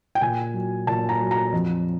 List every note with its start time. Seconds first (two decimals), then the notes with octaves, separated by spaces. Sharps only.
0.15 G5
0.21 A#2 G#5
0.54 F#3
0.87 A#2 A5
1.09 A#5
1.20 F#3
1.31 A#5
1.52 F2